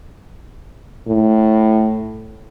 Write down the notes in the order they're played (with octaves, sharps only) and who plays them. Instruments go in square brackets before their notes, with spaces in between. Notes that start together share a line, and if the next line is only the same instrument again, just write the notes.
[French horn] A2